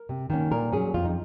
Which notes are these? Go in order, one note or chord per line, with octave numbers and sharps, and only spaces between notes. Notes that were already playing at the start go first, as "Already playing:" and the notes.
Already playing: A#4
C3
D#3 A#3 C#4
A#2 A#4
F#3 C#4 G#4
F2 F4
D#4